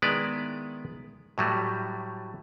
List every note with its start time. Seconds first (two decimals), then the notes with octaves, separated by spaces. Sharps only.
0.02 D#3 G#3 B3 E4 B4 D5
1.38 A2 F#3 G3 A3